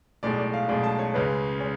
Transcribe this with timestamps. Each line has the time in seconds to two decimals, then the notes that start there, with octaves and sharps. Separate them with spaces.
0.23 B1 A2 G#3 D5
0.38 D5
0.54 F5
0.69 B1 A2 G#3 D5
0.83 A5
0.99 C#5
1.14 C#2 C#3 G#3 C#4 B4
1.60 G#3 C#4